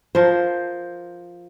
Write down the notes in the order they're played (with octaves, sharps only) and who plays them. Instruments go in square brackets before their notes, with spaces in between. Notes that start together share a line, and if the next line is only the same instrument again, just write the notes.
[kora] F3 A#4 C5